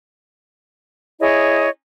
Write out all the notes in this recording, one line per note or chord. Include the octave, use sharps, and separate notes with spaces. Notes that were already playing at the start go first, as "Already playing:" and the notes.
E4 G#4 C#5 D#5